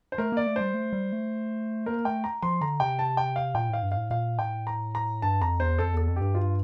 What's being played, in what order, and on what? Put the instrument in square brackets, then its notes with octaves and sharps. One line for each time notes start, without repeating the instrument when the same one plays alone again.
[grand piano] C5
[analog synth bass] A3 [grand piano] A#4
[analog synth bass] A#3 [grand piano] D5
[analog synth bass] A3
[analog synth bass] G3 [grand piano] C5
[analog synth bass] A3
G3
A3
[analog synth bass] A#3 [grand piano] A#4
[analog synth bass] A3 [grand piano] G5
[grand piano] A#5
[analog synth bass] F3 [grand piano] C6
[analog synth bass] D3 [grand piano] A#5
[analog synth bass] C3 [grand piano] G5
[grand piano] A5
G5
F5
[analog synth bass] A#2 [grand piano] G5
[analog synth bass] A2 [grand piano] F5
[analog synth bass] G2
[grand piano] F5
[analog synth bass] A2
[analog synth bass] A#2 [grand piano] F5
[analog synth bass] A2 [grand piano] G5
[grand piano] A#5
A#5
[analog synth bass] G2 [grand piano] A5
[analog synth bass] F2 [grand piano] A#5
[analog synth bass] E2 [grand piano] C5
[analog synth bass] F2 [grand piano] A4
[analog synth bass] E2 [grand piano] A4
[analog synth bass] F2
[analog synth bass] G2 [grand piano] G4
[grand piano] F4